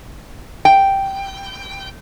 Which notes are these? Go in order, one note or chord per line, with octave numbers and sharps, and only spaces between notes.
G5